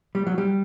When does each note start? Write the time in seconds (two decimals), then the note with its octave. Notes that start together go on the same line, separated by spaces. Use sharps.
0.15 G3
0.27 F#3
0.38 G3